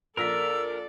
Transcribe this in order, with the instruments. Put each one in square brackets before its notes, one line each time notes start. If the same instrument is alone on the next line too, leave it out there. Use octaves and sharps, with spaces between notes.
[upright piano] A#1 A#6 B6 [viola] A4 D5 [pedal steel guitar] A#4 [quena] E6